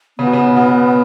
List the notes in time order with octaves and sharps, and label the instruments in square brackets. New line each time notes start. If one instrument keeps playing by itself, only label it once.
[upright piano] C#3 [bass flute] B3
[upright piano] B2
C#3
B2